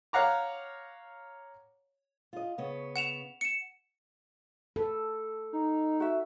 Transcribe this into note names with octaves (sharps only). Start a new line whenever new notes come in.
C#5 F5 F#5 A#5 D6
F4 D#5
C#3 B3 C#4
F#5 E7 F7
C#7 E7
A4 B4
D#4
F#4 E5